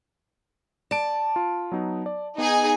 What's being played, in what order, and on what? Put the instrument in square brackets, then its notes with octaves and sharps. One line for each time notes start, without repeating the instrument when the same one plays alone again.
[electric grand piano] D5 D7 [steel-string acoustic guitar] A5
[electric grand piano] F4
F#3 B3 D#4
D5
[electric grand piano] B3 [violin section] D#4 G#4 G#5